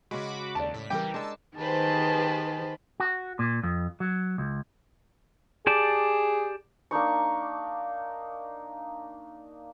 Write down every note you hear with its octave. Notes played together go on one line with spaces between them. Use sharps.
C#3 G#3 F#4 B5 D6
D#2 D5 A5
A2 B6
E3 G3 G4 A#4 G5
G#3 D4 A5 E6
D#3 G4 G#4 B4 C5 A5
F#4
A#2
F2
F#3
C#2
G4 G#4 D5 A5
A#3 D4 D#4 C#6